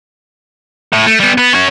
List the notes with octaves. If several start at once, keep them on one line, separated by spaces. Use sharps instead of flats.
A2
A3
G3 B3
B3
C#4 F#4